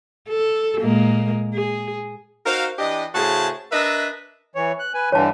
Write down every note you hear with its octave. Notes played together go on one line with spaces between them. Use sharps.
A4
A#2 G#3 A#3
G#4
D#4 F#4 A#4 C5 F5
E3 D4 G4 D#5
A2 C#3 F#4 G#4 C5 A5
D4 A#4 B4 D#5 E5
E3 C#5
F#6
B4 G#5
G2 D3 E3 C#5 A5